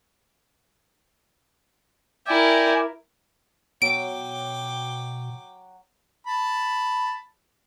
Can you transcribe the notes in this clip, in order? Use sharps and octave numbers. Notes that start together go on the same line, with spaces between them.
E4 A#4 D5 G5 G#5
B2 F#3 G5 D6 D7
A5 B5